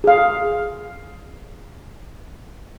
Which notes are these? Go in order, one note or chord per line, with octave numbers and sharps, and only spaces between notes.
G#4 F5